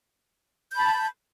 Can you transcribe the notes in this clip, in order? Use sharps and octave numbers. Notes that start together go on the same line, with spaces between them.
A5 B5 G6